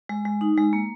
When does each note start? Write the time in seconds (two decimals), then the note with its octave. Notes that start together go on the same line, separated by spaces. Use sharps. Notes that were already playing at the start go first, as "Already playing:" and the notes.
0.09 G#3
0.25 G#3
0.41 D#4
0.57 G#3
0.73 A#3